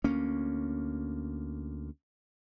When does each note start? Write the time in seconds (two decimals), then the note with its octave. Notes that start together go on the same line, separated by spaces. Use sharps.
0.04 D2 A#3 C#4